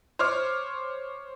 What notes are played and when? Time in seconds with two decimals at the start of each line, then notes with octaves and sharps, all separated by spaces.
0.19 C5 C#5 D6 F6